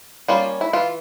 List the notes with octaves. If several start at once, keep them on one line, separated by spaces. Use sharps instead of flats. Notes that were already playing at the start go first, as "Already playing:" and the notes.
G3 A#3 C#4 F4
E4
E3 F4